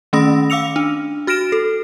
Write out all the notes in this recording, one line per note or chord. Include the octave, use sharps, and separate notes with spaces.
D#3 A3 C#4 B5 D#6 A#6
F5 D6 E6 C#7 F7
D4
F#4 F6 A#6 D7 E7
A4